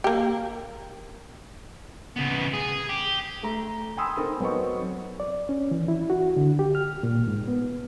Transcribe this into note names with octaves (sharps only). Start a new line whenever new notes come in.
A#3 G4
C#3 B3
G#4
G4
A3 A#5
G5 G#5 B5 C6 D#6 E6
C4 D#4 A4 A#4 D#6
F#3 B3 C4 A4 D#5 C#6
D5
C#4
E3
E4
F#4
D3
G4
F6
A#2
G#2
B3